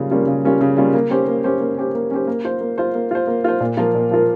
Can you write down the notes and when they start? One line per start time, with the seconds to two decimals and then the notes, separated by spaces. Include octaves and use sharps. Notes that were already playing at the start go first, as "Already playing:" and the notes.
Already playing: C#3 G3 A#3 C#4 F4
0.11 G3 A#3 C#4 F4
0.27 C#3
0.45 G3 A#3 C#4 F4
0.61 C#3
0.77 G3 A#3 C#4 F4
0.94 A#3
1.10 C#4 G4 C5
1.27 A#3
1.44 C#4 G4 C5
1.61 A#3
1.77 C#4 G4 C5
1.95 A#3
2.11 C#4 G4 C5
2.27 A#3
2.44 F4 C5
2.61 A#3
2.78 F4 C5
2.95 A#3
3.11 F4 C5
3.27 A#3
3.44 F4 C5
3.60 A#2
3.77 F3 A#3 F4 A#4
3.95 A#2
4.11 F3 A#3 F4 A#4